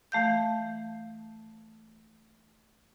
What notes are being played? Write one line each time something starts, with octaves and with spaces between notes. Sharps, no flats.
E3 A3 F5 G6